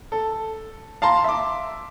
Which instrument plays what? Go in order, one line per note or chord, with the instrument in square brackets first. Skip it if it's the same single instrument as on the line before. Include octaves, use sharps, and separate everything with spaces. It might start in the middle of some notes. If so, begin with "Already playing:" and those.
[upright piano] A4
F5 A5 A#5 C6
E5 D6